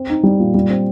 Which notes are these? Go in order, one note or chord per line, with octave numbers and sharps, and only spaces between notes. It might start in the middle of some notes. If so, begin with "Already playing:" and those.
Already playing: C4
D#4
G3
A#2
G3
C4